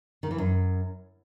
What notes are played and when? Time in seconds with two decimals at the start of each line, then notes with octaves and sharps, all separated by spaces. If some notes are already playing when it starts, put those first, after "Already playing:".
0.23 D#3
0.31 E3
0.38 F#2